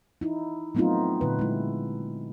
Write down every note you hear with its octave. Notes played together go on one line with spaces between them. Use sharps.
D#4 E4
F#3 A3 B3 C4 D#4 F4
A#2 D3 B4
G#3 E4